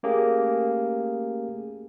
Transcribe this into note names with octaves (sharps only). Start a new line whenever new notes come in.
A3 A#3 C#4 G4 G#4